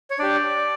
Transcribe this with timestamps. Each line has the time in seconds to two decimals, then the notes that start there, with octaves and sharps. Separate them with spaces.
0.11 C#5
0.19 D4 G4 D5